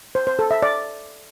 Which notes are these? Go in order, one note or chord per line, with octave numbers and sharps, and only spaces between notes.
C5
C5
A4
E5
D5